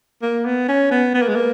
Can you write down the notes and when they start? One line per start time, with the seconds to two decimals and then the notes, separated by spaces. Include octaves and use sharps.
0.22 A#3
0.45 B3
0.68 C#4
0.91 B3
1.14 B3 B4
1.21 A#3
1.29 G#3
1.35 A#3